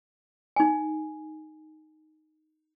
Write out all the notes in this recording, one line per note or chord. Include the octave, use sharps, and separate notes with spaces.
D#4 G#5